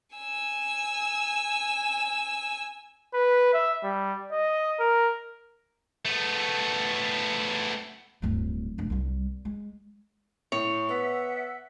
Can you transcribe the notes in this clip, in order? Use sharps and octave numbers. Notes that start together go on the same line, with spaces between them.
G#5 E6
B4
E5
G3
D#5
A#4
A3 B3
D1 G2
F1 D4
C2 G3
G#3
A2 C#5
B3 E5 F#5